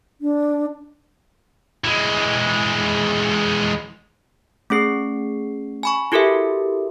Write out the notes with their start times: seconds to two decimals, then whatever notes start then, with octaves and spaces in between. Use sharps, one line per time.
0.21 D4
1.84 E3 G#3
4.70 A3 C#4 G#4 C7
5.83 G#5 B5 C#6
6.12 E4 F#4 G4 A4 A#4 E5